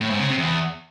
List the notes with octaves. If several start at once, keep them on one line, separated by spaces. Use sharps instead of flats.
A2
G#2
C#3
C3
E2